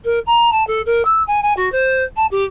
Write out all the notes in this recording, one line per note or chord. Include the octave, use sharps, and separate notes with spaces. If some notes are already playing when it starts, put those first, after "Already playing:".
A#4
A#5
A5
A4
A#4
E6
G#5
G#5
F#4
C5
A5
G4